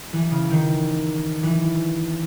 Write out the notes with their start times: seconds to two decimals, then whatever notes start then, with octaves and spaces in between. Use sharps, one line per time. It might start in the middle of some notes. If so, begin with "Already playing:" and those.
0.13 E3
0.31 C#3
0.50 D#3
1.43 E3